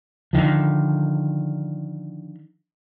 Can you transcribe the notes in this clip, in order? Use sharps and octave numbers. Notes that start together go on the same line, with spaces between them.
D3 D#3 F3